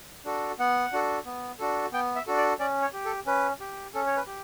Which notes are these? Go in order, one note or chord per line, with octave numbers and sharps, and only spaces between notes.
D4 F#4 A4
B3 F#5
D4 F#4 A4
B3
D4 F#4 A4
B3 G5
E5
D4 F#4 A4
D5
C#4 D5
C#5
G4
A4
C#4 B4
G4
C#4 A4
C#5
B4
G4